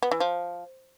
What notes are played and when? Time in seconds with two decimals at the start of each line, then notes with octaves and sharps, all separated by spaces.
0.03 B3
0.11 E3
0.20 F3